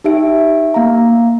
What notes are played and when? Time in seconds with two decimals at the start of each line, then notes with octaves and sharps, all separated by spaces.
0.04 D#4 G4 E5 D7
0.74 A#3 F5 A#5